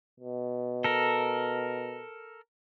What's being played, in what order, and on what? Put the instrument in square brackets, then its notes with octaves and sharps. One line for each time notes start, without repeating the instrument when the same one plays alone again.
[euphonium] B2
[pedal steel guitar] A4 A#4